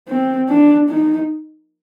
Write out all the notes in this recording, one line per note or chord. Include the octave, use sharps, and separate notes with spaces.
C4
D4
D#4